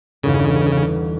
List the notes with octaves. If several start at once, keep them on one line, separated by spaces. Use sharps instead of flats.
G1 E2 C#3 D#4